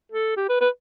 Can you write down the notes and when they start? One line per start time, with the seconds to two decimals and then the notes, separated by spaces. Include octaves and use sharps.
0.12 A4
0.37 G4
0.49 B4
0.60 B4